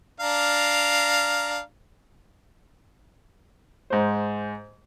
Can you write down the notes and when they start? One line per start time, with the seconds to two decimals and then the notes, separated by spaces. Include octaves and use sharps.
0.20 D4 F5 A#5
3.90 G#2 C5